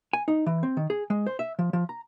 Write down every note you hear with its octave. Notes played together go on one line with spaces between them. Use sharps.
G#5
D#4
E3
C4
D#3
G#4
G#3
C5
E5
F3
F3
A#5